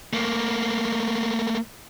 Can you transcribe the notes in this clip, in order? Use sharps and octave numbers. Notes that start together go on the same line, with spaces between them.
A3 A#3